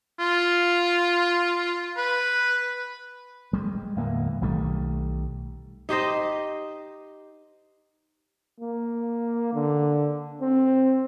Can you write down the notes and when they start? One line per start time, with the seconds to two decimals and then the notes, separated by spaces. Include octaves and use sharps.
0.19 F4
1.97 B4
3.53 G3 G#3
3.96 D1 E2 A#3
4.41 B1 D#3 G3 A3
5.89 D#4 G4 C5 D#5
8.60 A#3
9.53 D3
10.41 C4